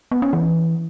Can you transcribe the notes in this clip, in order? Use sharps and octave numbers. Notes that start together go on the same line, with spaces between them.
B3
C#4
E3